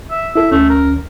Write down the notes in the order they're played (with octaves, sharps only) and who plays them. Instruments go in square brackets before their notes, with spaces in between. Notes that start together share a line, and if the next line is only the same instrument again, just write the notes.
[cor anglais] E5
[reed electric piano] E4 A4 [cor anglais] E5
[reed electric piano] D2 C#4 [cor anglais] A3
[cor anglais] A#4